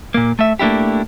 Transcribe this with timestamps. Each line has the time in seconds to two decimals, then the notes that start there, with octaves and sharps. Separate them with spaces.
0.14 A#2 A#3
0.39 A3 E5
0.59 A3 A#3 D4 E4 G4